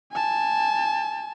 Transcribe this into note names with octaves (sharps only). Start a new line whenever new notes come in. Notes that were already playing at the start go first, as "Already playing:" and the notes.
G#5 A5